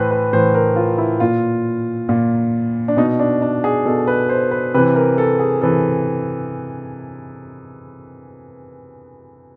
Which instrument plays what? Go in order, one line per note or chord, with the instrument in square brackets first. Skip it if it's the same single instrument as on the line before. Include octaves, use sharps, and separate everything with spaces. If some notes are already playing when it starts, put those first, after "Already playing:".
Already playing: [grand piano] A2 E3 B4 C5
B4
A2 E3 C5
A#4
F4
E4
A#2 F4
A#2
D4
B2 D#4
D4
D4
G#4
B2 A4
B4
C5
B4
C3 E3 B4
A#4
A4
G#4
C3 E3 A4